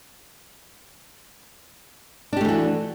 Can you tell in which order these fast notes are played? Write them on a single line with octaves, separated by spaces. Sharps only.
D4 G4 A3 E3 F#4